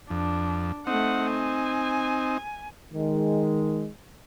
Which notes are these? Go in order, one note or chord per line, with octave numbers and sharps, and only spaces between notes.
F2 D4
A3 C4 D#4 F#5
G#5
D#3 G#3